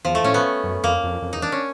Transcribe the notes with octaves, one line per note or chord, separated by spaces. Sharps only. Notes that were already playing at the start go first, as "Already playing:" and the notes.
E2 F3
A3
A2 C#4
B3
F#2
F2 A#3
F2
F2
E2 D#4
D4
C#4